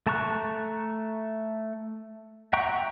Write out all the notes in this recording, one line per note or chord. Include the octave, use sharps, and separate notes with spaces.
A3 A5 A#5 C#6 F#6
E5 F#5 G5 A#5 C#6